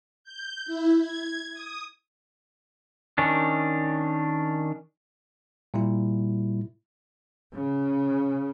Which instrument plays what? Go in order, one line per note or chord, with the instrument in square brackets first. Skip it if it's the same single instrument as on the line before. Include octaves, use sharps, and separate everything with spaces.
[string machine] G6
E4
G#6
D#6
[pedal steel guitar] D#3 C#4 D4
[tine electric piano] A#2 G3 A#3 E4
[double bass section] C#3